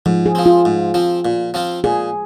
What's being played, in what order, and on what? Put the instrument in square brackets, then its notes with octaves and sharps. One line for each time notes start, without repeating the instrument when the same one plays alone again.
[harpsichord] G#2 [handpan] F3
[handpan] G#4
[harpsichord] F3 C4
[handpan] F4
[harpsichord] G#2
F3 C4
A#2
F3 C4 F4
[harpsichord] A#2 [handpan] G#4